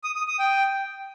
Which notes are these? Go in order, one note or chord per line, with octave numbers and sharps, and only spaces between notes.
D#6
D#6
D#6
G5